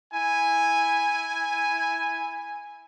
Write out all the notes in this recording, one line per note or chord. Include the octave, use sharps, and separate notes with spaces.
E4 G#5